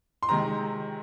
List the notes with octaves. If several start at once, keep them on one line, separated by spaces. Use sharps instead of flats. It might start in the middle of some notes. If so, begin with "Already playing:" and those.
C6
C3 D#3 G#3 A#5